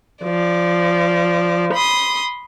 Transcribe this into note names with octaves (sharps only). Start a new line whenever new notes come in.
F3 D5
B5 C6 D#6